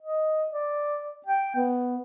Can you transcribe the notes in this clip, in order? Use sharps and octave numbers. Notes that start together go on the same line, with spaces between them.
D#5
D5
G5
B3